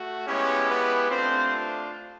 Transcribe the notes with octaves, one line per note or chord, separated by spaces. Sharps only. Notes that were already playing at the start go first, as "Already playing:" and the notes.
Already playing: A3 F#4
G#3 B3 C#4 E4 G4 C#5
B3 B4
A3 C4 D4 F4 C5